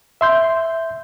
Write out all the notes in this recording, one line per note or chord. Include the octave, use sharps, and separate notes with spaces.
E5 C6 G6